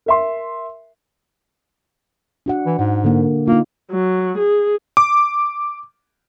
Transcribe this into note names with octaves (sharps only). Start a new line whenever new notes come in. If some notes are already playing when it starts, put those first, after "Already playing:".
A#4 E5 C6
D4 F#4 F#5
E3
G#2 F#5
D3 A#3
A#3 D#4 F4
F#3
G#4
D6